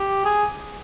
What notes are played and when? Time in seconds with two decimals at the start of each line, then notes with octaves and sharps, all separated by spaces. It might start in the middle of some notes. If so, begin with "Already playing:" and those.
Already playing: G4
0.25 G#4